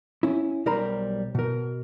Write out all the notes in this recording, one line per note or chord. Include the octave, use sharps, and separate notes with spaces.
C#4 E4
B1 G3 A#4 C5 A#5 B5
B2 A#4